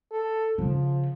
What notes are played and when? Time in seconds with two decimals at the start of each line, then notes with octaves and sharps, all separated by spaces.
0.11 A4
0.58 C#3 F3